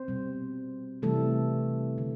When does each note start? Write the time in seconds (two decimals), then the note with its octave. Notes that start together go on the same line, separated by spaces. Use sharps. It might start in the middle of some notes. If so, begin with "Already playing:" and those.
Already playing: C4 C5
0.08 B2 G3
1.02 C3 E3 G3 A3 A4
1.98 D3